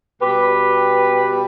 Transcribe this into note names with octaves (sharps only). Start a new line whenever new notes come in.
B2 G3 G4 B4